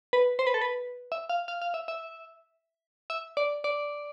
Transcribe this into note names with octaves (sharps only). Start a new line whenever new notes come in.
B4
C5
B4
A4
B4
E5
F5
F5
F5
E5
E5
E5
D5
D5